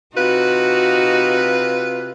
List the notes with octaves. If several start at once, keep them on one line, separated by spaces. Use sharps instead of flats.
C3 D#4 F4 F#4 B4